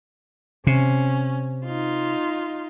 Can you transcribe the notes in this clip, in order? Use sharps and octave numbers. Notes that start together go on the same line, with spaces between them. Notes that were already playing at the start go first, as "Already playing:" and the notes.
C3 C#4
D#4 F4